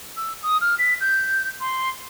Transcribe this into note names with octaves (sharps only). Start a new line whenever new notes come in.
E6
D#6
F6
B6
G6
C6